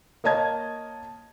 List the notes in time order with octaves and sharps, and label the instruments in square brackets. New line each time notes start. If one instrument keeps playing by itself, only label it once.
[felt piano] A#3 C#5 D#5 A5 G#6